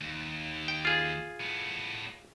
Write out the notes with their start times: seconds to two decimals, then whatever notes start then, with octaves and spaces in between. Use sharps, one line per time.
0.01 D#2
0.68 G5
0.85 F4 G#4
1.40 A2 B3